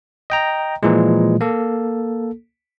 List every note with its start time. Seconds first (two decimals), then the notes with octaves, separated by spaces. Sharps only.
0.30 D#5 G5 A#5
0.83 A#2 E3 F3 G#3
1.41 A#3 A4